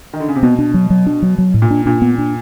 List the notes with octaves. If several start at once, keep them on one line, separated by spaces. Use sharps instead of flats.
D#3
D3
C#3
C3
B2 B3
D4
F#3
F#3
D4
F#3
F#3
A2
A#2
D4
A#2 D4
B3
D4